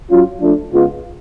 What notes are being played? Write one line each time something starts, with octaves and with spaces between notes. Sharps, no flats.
F#3 C#4 F4
F3 A3 D4
C#3 G#3 B3 F4